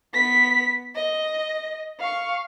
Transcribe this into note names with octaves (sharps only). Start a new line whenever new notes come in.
B3 B6
D#5
F5 C#6